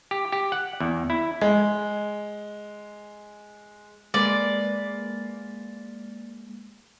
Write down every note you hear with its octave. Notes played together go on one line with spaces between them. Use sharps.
G4
G4
F#5
E2
E4
G#3 D#5
G#3 A#3 B4 D5